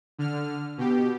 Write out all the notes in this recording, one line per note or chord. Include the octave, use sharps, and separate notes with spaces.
D3 F6
B2 G4